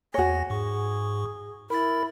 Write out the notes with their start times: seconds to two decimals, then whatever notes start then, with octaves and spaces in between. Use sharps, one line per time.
0.14 E2 F#4 C#5 G#5 A#6
0.50 G#2 G#4 C#6
1.70 E4 A#4 B5 A6